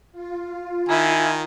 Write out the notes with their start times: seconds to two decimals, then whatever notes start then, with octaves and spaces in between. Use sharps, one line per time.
0.12 F4
0.89 D#3 E4 G#5